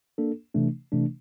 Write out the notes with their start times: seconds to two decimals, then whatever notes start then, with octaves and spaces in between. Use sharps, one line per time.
0.18 A#3 D4 A4
0.55 C3 E3 A3 D4
0.92 C3 E3 A3 D4